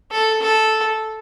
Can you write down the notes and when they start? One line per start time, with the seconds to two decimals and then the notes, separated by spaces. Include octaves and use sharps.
0.12 A4
0.42 A4